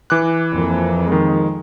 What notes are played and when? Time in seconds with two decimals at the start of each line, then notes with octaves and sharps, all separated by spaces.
0.10 E3 D6 F#6
0.52 F2 F3 A#3
1.07 D#3 G#3